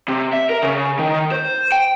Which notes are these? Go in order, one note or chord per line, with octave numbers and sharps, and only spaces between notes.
C3
E5
A#4
C#3
D#3
C5
G5